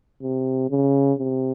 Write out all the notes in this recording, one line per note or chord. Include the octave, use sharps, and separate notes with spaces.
C3
C#3
C3